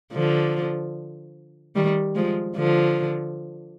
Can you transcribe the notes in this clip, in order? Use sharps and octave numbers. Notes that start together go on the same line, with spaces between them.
D3 F3
D#3 G3
F3 G#3
D3 F3